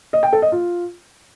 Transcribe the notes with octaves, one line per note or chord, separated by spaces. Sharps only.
D#5
G5
A4
D#5
F4